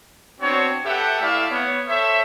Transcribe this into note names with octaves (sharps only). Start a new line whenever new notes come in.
B3 C4 D4 F#4 C#5
G4 A4 B4 E5 F#5 G5
A3 E4 D5 E5 F5
B3 C#5
A4 C5 C#5 E5